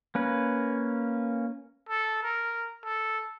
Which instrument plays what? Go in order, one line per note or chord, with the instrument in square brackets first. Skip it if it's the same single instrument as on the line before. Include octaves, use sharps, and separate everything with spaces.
[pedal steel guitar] A#3 C#4 B4
[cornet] A4
A#4
A4